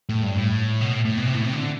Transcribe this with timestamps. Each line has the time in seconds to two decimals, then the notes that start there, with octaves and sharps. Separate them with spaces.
0.09 A2
0.23 G2
0.37 A2
0.81 B2
0.93 A2
1.05 A2
1.17 B2
1.26 C3
1.35 A2
1.44 C3
1.53 D3